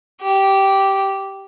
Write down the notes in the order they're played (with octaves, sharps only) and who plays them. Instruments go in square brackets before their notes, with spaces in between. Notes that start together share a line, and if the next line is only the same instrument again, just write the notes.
[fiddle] G4